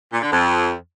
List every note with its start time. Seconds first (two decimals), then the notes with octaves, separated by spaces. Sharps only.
0.12 A#2
0.22 D3
0.31 F2